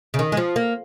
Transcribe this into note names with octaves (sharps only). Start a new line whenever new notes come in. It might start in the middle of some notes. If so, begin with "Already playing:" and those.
C#3
D#3
G#3
F3
A#3